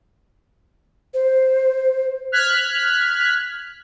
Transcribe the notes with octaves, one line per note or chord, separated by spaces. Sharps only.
C5
F6 F#6 G#6 B6